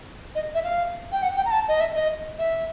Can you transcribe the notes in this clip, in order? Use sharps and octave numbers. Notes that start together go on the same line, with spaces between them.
D#5
E5
F5
G5
F#5
G5
A#5
A5
D#5
E5
D#5
E5